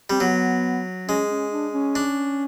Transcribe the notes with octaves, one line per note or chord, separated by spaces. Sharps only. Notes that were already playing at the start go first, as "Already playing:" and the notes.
G3 C4
F#3 B3
G#3 C#4
C#4
D4
C#4
D4